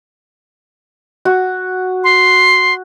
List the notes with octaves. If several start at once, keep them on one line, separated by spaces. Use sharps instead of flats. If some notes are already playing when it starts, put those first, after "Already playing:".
F#4
C6